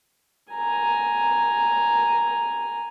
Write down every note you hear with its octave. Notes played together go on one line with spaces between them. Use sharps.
G#5 A#5